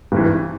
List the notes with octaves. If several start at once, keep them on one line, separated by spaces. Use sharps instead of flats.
G#1 G2 E3